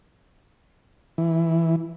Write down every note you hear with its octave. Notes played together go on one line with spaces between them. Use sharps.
E3